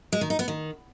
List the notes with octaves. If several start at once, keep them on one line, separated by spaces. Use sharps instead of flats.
G#3
D#3
D#4
B3
D#3